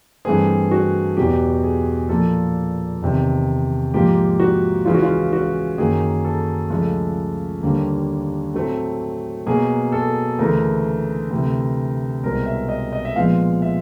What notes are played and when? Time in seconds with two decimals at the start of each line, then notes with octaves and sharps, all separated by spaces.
0.25 G2 E3 A3 C4 G#4
0.71 F#4
1.17 E2 B2 F#3 G4
1.63 G#4
2.09 A#2 F3 A#3 A4
3.02 E2 C3 D#3
3.94 G#2 F3 A#3 G4
4.40 F#4
4.85 C#2 C#3 E3 F4
4.94 F#4
5.02 F4
5.33 F#4
5.78 F#2 D#3 F#3 A#3 G#4
6.25 A4
6.70 C#2 C#3 F3 A3 A4
7.63 D#2 D3 G3 A#3
8.54 A2 F#3 A3 C4
9.46 B2 F#3 A#3 G#4
9.92 A4
10.39 D2 C#3 E3 A3 A#4
11.31 D2 C3 E3
12.23 C2 B2 G#3 C4 A#4
12.46 E5
12.69 D#5
12.93 D#5
13.05 E5
13.16 A#2 F3 G#3 B3 F5
13.62 E5